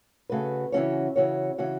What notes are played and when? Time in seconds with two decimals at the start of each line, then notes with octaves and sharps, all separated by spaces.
0.30 C#3 A3 F#4 B4
0.72 C#3 E3 C#4 F#4 C#5
1.16 C#3 E3 C#4 F#4 C#5
1.58 C#3 E3 C#4 F#4 C#5